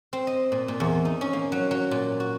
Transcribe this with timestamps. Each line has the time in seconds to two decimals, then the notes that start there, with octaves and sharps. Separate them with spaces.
0.13 C4
0.27 D#5
0.52 A#2
0.68 A#2
0.80 E2
1.05 D#4
1.21 C#4
1.33 A#3
1.52 F#3
1.71 F#3
1.91 A#2
2.20 F#4